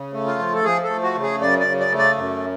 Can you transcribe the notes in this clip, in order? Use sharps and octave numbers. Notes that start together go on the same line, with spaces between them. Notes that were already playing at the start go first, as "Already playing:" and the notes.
Already playing: C#3
A3
F4
F3
A4
F3 G#4
A4
A3
F#4
C#3
G#4
F#2 D5
D5
C#3
D5
A3
D5
F#2